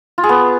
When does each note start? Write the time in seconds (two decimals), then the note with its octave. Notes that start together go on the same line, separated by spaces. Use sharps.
0.18 F4
0.23 G#4
0.29 B3